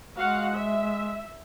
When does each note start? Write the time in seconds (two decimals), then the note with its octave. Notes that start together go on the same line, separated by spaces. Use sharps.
0.17 G#3 F#4 F5 F#5
0.54 E5